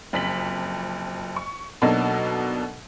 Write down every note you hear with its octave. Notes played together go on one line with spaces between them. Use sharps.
F#1 F2 B6 F#7
C#6
B2 F#3 A#3 D4 D#4 A4